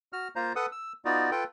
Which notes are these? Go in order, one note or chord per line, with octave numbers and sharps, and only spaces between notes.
F#4 F6
A#3 F4 C5 A#5
A4 B4 F#5 D#6
E6
B3 D#4 F4 F#4 D5
F4 A4 B4 G5